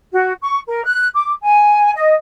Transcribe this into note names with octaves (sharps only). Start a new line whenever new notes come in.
F#4
C#6
A#4
F#6
D6
G#5
D#5